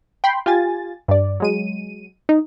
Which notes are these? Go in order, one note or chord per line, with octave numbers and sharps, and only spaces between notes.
G5 B5 C6
F4 G4 G#5 A6
G2 D5
F#3 G#3 D#7
D#4